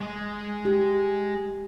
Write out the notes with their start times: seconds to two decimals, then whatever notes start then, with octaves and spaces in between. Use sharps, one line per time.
0.01 G#3 D#5
0.65 G4